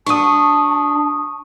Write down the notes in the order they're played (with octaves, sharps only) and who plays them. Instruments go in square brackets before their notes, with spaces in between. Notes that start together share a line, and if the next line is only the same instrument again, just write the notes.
[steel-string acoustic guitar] D4 F#4 [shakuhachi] A5 [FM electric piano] C#6 D#6